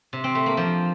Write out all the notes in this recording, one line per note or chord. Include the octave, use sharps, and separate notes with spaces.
C3
C4
A3
A#3
F3